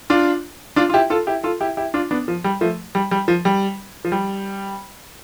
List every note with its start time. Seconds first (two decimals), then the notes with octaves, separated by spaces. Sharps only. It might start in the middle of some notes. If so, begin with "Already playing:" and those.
0.10 D4 F4
0.76 D4 F4
0.90 F4
0.94 E4 G4
1.10 F4 A4
1.27 E4 G4
1.44 F4 A4
1.61 E4 G4
1.77 E4 G4
1.94 D4 F4
2.11 B3 D4
2.28 F3
2.44 G3
2.61 F3 A3
2.95 G3
3.11 G3
3.28 F3
3.45 G3
4.05 F3
4.12 G3